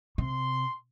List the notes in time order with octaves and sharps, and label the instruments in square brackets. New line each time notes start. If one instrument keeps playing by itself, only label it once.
[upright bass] C3 [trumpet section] C6